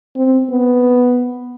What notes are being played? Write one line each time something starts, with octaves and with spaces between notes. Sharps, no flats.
C4
B3